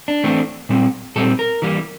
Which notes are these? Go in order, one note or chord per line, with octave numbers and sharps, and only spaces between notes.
D4
E3 A3 C4
A#2 G3 C4
A#2 G3 C4 A4
A#4
E3 G3 A#3